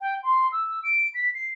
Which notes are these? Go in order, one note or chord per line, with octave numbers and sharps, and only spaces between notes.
G5
C6
E6
D7
B6
C7